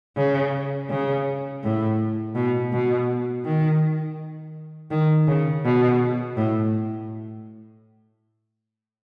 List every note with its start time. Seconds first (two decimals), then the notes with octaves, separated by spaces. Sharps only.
0.17 C#3
0.90 C#3
1.63 A2
2.35 B2
2.72 B2
3.45 D#3
4.91 D#3
5.28 C#3
5.65 B2
6.37 A2